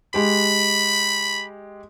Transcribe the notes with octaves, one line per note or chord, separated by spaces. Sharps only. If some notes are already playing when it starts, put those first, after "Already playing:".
G#3 G4 B5